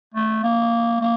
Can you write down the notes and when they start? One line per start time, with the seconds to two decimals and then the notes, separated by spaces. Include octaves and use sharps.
0.14 A3
0.43 A#3
1.01 A#3